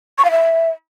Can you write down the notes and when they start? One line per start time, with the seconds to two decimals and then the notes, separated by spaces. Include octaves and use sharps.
0.18 C#6
0.25 F5
0.31 E5